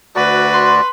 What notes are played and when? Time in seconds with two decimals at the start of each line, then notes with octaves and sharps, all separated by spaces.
0.16 D2 F#4 B4 D5
0.54 C6